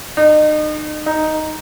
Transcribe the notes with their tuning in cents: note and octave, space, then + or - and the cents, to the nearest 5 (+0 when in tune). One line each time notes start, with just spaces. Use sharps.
D#4 -35
D#4 +0